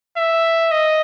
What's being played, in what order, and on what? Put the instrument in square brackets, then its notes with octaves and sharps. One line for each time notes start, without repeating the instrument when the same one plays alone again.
[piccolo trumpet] E5
D#5